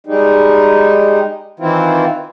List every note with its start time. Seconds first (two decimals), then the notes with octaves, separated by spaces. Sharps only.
0.07 G3 G#3 D#4
1.60 D#3 E3 C4 E4 F4